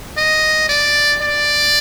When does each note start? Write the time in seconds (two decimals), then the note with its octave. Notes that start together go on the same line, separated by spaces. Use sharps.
0.18 D#5
0.69 D5
1.22 D5